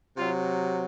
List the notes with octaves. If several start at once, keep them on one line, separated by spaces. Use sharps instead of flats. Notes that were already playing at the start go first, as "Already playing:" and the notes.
C3 F#3 F4